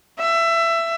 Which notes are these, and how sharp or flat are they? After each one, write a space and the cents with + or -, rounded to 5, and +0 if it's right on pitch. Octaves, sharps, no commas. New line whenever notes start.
E5 +20